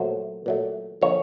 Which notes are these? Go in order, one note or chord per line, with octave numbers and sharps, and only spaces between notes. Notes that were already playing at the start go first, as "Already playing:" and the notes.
Already playing: A#2 F#3 A3 C5
A#2 F#3 A3
D3 F3 A#3 C#5